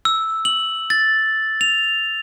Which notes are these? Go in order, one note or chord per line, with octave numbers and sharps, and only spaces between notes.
E6
F#7
A6
F7